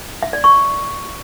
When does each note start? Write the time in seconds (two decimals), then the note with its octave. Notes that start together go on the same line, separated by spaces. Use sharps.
0.23 E5
0.33 D5
0.44 C#6